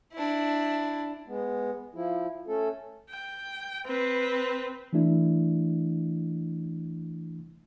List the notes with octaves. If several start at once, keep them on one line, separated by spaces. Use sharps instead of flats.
D4 E4
G#3 B3
F3 E4
A3 C#4 A4
G5
C4 B4
E3 A3 D4 E4